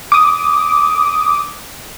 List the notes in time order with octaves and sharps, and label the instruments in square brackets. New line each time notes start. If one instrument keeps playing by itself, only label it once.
[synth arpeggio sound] D6 D#6